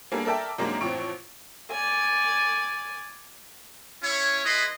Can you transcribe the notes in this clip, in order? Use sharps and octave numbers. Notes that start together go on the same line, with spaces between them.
G3 A#3 B3 D4 G#4 A4
A4 A#4 D5 E5 G5 A5
F#2 C3 G#3 A#3 D4 D#4
A1 F2 E3 C4 C#6 D7
D5 G#5
C#4 E4 C#5
E4 G#4 B4 D#5 C6